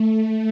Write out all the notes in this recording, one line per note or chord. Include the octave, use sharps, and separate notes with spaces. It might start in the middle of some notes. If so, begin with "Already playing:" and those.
Already playing: A3